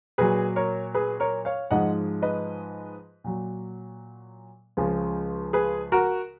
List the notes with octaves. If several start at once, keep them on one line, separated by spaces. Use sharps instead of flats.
A#2 F#3 G#4 B4
A#4 C#5
G#4 B4
A#4 C#5
C#5 F5
G#2 F3 G#3 D#5 F#5
B4 D#5
A#2 F#3
C#2 C#3 F3 G#3
G#4 B4
F#4 A#4